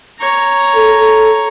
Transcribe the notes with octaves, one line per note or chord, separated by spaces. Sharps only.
C#5 A#5
A4